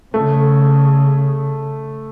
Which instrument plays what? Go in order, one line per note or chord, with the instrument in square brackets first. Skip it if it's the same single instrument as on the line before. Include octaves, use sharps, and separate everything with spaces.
[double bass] C#3 [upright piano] A3